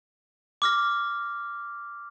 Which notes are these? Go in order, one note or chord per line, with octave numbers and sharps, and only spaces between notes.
D6 F6 A#6